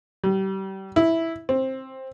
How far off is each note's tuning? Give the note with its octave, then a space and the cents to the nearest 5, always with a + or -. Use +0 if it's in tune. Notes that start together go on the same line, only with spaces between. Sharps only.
G3 -30
E4 -5
C4 +15